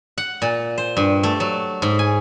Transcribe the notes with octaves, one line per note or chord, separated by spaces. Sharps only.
F#5
A#2
C5
G2
A3
F#3
G#2
G#5